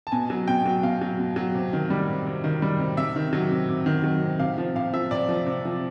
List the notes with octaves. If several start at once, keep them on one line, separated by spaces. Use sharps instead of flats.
A5
B2 G#5
F#3
B2 G5
F#3
B2 F5
F#3
B2
F#3
C3
D#3
G3
C3
C3
D#3
G3
C3
C3 E5
D#3
F#3
C3
C3
D#3
F#3
C3
C3 F5
F3
C3 F5
F3 E5
C3 D5
F3
C3
F3